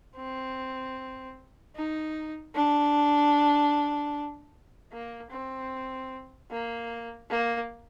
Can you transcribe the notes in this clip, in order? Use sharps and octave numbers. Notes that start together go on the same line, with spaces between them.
C4
D#4
D4
A#3
C4
A#3
A#3